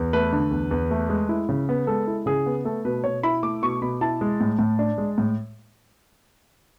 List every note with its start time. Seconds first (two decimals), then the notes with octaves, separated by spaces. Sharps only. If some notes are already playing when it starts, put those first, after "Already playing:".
Already playing: E2
0.13 A3 B4
0.33 D3
0.51 E2
0.71 E2
0.91 A3
1.09 G#3
1.29 E4
1.49 C#3
1.69 B3
1.87 G#3 A4
2.07 E4
2.26 C#3 G#4
2.46 B3
2.65 A3 A4
2.85 B2 B4
3.04 B2 C#5
3.23 E4 B5
3.43 A3 D6
3.62 B2 C#6
3.81 B2 B5
4.01 E4 A5
4.21 G#3
4.41 A2
4.59 A2
4.79 D4
4.98 G#3
5.18 A2